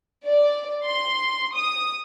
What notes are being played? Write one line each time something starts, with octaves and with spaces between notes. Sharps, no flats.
D5
C6
D#6